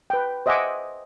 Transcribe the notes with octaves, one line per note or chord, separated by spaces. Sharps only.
B4 G5
C5 D#5 E5 F#5 G#5 D6